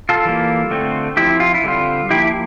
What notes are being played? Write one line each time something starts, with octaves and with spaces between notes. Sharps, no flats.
F4 A4
E3 G3 A#3
D3 A3 C4
F3 C4 E4 G4
F4
E4
D3 G3 C4 F4
F3 A#3 E4 G4